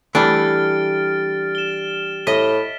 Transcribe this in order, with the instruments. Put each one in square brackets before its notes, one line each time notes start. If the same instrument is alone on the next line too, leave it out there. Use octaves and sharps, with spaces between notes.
[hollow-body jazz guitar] E3 G3 A3 [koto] D4 [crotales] F6 A6 D7
[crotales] E7 G7
[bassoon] A2 [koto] D#5 [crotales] B6